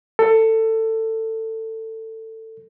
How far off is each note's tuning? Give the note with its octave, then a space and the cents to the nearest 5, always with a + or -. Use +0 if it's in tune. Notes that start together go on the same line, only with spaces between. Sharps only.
A4 +20